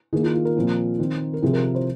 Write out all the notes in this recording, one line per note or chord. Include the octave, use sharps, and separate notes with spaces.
D#3 A#3 G#4
F4
F4
A#4
A#2 F3 C4
D#3 C4
A#4
C3 F3 C4 G#4
A#4
A#4
C5